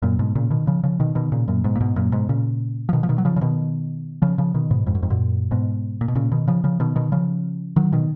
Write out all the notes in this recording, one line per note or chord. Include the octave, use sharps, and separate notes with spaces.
F#2 A#2
G#2 B2
A#2 C#3
B2 D#3
C#3 F3
C#3 F3
B2 D#3
B2 D#3
A#2 C#3
F#2 A#2
G#2 B2
A#2
G#2 B2
F#2 A#2
G#2 B2
A#2 C#3
F3
B2 D#3
F3
B2 D#3
F#3
C#3 F3
C#3
B2 D#3
C#3 F3
C#3 F3
B2 D#3
G#2 B2
F2 G#2
F#2
F2 G#2
F#2 A#2
G#2 B2
A#2
B2
A#2 C#3
B2 D#3
C#3 F3
C#3 F3
B2 D#3
B2 D#3
C#3 F3
D#3 F#3
B2 D#3